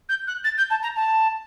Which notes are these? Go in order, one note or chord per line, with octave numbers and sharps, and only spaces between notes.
G6
F#6
A6
G6
A5
A#5
A5